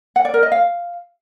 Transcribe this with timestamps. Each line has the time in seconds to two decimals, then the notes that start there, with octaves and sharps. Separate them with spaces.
0.16 F#5
0.25 D5
0.34 A#4
0.43 D#5
0.52 F5